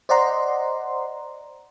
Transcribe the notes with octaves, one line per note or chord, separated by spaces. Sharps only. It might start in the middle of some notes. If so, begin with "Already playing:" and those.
C5 D5 D#5 F#5 A#5 C6